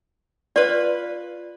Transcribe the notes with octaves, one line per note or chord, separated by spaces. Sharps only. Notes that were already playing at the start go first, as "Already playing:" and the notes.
F4 B4 D5